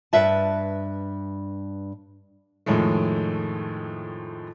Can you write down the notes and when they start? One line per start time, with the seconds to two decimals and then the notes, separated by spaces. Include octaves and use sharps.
0.13 G2 B4 E5 A5
2.66 F2 A2 D#3 G#3 A3